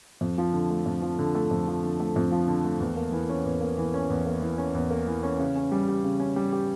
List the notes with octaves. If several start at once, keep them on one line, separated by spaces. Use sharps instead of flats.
F2
F3
D3
A3
F2
F3
D3
A3
F2
F3
D3
A3
F2
F3
D3
A3
E2
A#3
E3
C#4
E2
A#3
E3
C#4
E2
A#3
E3
C#4
E2
A#3
E3
C#4
C#3
C#4
G3
G4
C#3
C#4
G3
G4